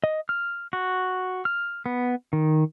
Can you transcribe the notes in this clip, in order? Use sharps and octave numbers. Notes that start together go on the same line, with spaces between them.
D#5
F6
F#4
F6
B3
D#3